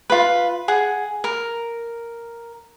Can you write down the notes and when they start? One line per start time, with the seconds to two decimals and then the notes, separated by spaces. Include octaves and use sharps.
0.10 F4 B4
0.68 G#4 F#5
1.24 A#4